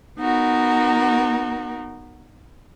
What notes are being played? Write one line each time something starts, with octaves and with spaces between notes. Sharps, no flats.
B3 D#4 F#4 A#4